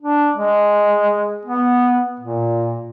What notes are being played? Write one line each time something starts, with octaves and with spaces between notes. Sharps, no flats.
D4
G#3
B3
A#2